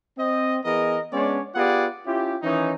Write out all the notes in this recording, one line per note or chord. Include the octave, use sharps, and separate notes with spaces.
C4 D#5
E3 B3 G#4 A#4 D#5
G#3 B3 C#4 D4 C#5 D5
B3 F4 G4 G#4 D5 F#5
C#4 E4 F4 G4
D#3 E3 C#4 D#4